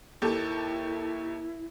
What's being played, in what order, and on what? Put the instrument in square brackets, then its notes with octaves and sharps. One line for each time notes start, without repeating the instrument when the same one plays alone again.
[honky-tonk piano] D#2 G4 A4 [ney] E4